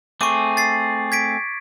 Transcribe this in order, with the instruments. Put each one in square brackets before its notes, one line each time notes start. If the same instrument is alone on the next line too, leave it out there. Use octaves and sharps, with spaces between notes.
[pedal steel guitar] A3 C4 G#4 [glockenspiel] C#6 D6
[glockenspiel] A6 C7
G#6 B6 D7